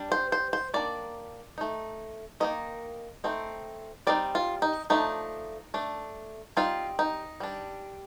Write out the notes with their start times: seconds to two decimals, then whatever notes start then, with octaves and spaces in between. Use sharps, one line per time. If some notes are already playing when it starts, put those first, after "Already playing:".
Already playing: G3 D4
0.12 C5
0.32 C5
0.53 C5
0.74 D#3 A#3 D4 D5
1.58 A3 D#4
2.40 D#3 A#3 D#4 D#5
3.24 A3 C4 D#4
4.07 G3 C4 D#4 D5
4.35 F4
4.62 D#4
4.90 F3 A3 D4 D#4
5.74 A3 D4
6.57 G3 C4 D#4 F4
6.99 D#4
7.40 G3 D4